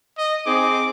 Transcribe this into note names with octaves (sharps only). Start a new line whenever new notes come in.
D#5
C4 D#4 G#4 D6